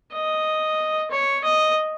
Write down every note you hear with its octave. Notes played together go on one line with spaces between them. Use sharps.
D#5
C#5
D#5